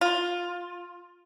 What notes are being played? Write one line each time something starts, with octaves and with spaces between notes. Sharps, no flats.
F4